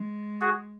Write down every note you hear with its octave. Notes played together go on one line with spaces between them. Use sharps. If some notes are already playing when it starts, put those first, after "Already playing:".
Already playing: G#3
F#4 G#4